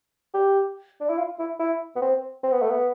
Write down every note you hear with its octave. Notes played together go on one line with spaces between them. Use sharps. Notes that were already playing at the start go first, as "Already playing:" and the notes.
G4
D4
E4
F4
E4
E4
B3
C4
C4
B3
A3
B3